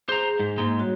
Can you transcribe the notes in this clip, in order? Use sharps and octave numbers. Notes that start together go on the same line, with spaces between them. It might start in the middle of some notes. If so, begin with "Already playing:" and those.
G#4 C5 A#5
G#2
G#2 G#3 A#3
G3 F#4 C#5